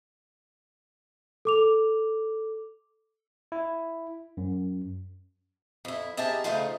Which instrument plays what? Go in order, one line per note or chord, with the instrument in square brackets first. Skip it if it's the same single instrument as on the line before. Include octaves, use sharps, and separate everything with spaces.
[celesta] A4 D6 F7
[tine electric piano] E4
F#2
[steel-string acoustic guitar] F2 E4
D#4 E4 G4 G#4 A#4 A5
C#3 F3 A3 D#4 F4 C5